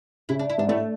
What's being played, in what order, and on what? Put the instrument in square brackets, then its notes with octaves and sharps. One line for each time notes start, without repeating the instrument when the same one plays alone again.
[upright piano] C#3 [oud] E4
[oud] D4
E4
[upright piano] G#2 [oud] D4
[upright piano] A2 [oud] A3